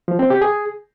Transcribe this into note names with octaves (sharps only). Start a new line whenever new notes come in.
F3
C4
G4
G#4